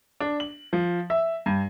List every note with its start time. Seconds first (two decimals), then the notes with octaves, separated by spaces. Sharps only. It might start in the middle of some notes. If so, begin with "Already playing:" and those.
0.20 D4
0.40 F#7
0.73 F3
1.10 E5
1.46 G2